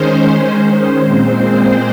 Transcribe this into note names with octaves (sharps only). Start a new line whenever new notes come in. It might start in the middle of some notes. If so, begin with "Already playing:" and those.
Already playing: D#3 G#3 C#4 C5
C5
A#2 G#3 C4